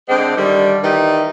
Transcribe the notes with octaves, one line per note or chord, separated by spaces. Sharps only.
D3 G#3 C4
D3 D#3 G3
D#3 E3 G3 D#4